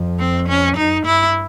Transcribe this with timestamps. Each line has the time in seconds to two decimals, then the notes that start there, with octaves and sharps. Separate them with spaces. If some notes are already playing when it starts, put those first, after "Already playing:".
Already playing: F2
0.19 C4
0.48 C#4
0.77 F#2 D#4
1.05 G2 E4